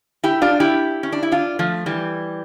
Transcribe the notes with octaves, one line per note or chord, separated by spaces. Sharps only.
E4 G4
D4 F4
E4 G4
C#4
D4
E4
D4 F4
F3 A3
E3 G3